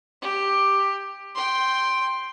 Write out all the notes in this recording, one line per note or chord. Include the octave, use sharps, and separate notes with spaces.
G4
G5 C6